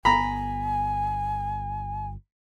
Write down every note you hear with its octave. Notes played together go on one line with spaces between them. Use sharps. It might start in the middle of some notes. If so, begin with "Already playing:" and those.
G1 B3 G#5 A#5 B5